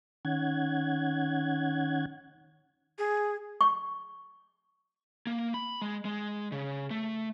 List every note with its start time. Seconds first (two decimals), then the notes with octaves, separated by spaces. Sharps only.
0.25 D#3 C#4 F#5 G#6
2.98 G#4
3.61 C#6
5.27 A#3
5.54 B5
5.82 G#3
6.05 G#3
6.52 C#3
6.91 A3